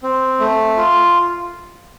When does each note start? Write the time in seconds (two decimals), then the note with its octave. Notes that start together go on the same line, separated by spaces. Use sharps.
0.03 C4
0.40 A3
0.77 F4